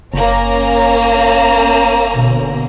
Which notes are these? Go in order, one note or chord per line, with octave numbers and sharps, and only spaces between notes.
F#1 A#3 C#4 A#5
B2 D3